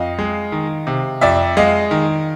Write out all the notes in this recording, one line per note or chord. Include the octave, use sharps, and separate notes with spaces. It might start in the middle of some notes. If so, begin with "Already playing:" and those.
Already playing: F2 D#5 F5
G#3
D#3
C3
F2 D5 E5
G#3 D#5 F5
D#3